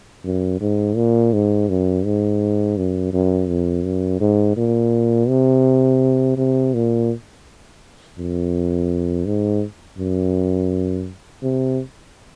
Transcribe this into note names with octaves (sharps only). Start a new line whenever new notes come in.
F#2
G#2
A#2
G#2
F#2
G#2
F#2
F#2
F2
F#2
G#2
A#2
C3
C3
A#2
F2
G#2
F#2
C3